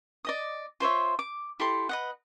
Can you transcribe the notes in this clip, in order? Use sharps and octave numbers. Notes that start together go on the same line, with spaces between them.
D5 D#5 D#6
F4 C5 C#5 E5
D6
E4 G4 A4 C6
B4 D#5 F#5